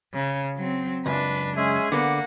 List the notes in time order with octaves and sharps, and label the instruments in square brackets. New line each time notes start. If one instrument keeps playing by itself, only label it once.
[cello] C#3
F#3 C4
[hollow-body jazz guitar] C#2 F#2 [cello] D4 B4
[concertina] G#3 C#4 E5 [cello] G#4
[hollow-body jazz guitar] D3 B3 [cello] A#3 F#5 [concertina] D6